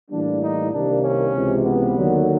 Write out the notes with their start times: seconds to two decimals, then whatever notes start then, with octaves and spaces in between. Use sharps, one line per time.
0.11 A2 E3 G3 A#3 D4
0.42 D#4
0.72 C2 C3 D#3 G3 A#3 D4
1.03 C#4
1.34 C#2 C3 E3
1.64 B3
1.96 D#2 D3 F#3